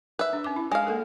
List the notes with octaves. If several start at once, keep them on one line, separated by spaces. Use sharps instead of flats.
B4 E5
D4
C#4 D6
E4
G#3 F5
A#3 A4 A#4